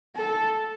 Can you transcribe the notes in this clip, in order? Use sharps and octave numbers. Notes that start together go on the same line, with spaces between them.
A4